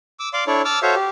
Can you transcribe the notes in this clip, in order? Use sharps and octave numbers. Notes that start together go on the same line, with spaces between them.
D6 E6
D5 F5 C6 D6
D4 E4 A4 C#5 D5
A5 D6 E6 F6
F#4 A4 C5 C#5 E5 F5
G4